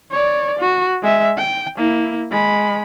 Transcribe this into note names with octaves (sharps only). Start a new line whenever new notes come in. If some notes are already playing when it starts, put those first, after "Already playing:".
C#5 D5
F#4
G#3 E5
G5
A#3 E4
G#3 B5